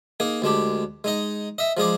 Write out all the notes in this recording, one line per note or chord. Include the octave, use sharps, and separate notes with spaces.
A#3 D#4 G#4
D2 G#3 D4 G4
G#3 D#4 D#5
D#5 E5
F3 G#3 G#4 D5